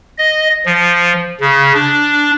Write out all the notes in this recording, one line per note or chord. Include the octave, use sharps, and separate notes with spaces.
D#5
F3
C#3
D4